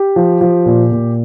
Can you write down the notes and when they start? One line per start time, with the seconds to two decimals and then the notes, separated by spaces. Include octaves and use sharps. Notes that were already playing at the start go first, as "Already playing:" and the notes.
Already playing: G4
0.16 F3
0.41 F3
0.66 A#2
0.92 A#2